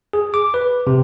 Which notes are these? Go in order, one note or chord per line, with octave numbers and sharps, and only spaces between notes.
G#4
D6
B4
C3